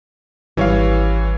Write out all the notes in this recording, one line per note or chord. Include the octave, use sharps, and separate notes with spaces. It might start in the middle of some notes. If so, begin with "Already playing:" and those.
G#1 E3 G3 C#4 C#5 F5